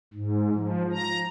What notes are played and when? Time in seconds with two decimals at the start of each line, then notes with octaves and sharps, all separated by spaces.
0.14 G#2
0.55 F3
0.92 A#5